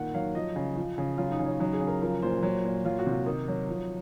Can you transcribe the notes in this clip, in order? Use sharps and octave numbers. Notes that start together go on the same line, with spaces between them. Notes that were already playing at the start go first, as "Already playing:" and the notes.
Already playing: A#2 D#3 F#5
F#3 F5
F3 D#5
C#3
F3
C#3
F#3 F4
D#4
C#3
C#4
F#3 D#4
G#4
C#3
A#4
F3 A#4
A#2 C5
F#3
A#2
F#3 F4
F#4
C3
F4
D#3 D#4
F#3
F3